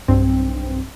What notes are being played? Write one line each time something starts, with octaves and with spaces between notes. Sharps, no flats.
B1 G2 C4